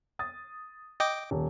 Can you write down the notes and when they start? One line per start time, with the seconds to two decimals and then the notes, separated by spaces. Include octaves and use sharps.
0.19 D#6 A6
1.00 D#5 G5 D6
1.31 D#1